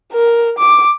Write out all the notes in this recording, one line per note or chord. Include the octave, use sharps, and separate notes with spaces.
A#4
D6